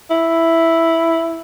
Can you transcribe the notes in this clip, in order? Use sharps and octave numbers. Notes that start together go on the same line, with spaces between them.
E4